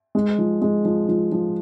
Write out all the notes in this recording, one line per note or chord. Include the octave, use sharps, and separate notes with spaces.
G#3
F3
G#3
F3
F3
F3